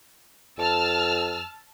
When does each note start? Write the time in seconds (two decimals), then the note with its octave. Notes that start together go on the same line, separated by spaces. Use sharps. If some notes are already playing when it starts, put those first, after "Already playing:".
0.58 F2 A5 E6 F6